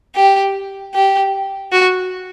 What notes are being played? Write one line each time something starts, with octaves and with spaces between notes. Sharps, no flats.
G4
G4
F#4